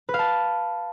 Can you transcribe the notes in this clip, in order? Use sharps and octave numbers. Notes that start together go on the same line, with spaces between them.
B4
F5
A5